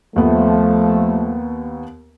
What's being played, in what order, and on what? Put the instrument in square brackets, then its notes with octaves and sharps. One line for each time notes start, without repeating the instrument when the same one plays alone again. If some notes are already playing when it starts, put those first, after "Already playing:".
[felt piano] D#2 B3 [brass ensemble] F3 A3